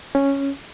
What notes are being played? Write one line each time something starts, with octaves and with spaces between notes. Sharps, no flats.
C#4